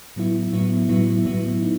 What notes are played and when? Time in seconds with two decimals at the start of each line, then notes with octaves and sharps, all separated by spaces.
0.16 A2 F#3 B3 E4
0.52 A2 F#3 B3 E4
0.89 A2 F#3 B3 E4
1.26 A2 F#3 B3 E4
1.62 D#4